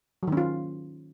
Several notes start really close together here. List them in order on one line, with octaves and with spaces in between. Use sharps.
F#3 D#3 C#4 F4